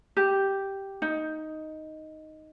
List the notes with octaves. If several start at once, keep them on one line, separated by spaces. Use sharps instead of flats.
G4
D#4